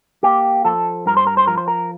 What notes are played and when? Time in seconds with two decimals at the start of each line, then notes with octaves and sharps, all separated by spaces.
0.23 A#3 G4
0.65 F3 A4
1.06 G2 A#4
1.17 C5
1.27 A#4
1.37 C5
1.47 F3 A#4
1.57 C5
1.68 A#4